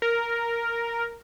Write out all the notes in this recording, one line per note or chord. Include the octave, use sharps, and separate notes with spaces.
A#4